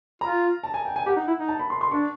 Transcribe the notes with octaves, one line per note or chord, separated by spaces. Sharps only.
F4 A#5
A5
G#5
G5
G#5
G4 F#5
D#4
E4
D#4
A5
B5
C6
C6
D4 C#6